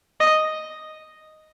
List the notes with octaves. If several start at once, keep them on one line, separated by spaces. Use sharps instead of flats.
D#5